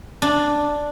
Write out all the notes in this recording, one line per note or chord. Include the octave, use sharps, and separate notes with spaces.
D4